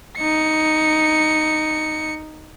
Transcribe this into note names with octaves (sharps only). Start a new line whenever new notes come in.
D#4 C#7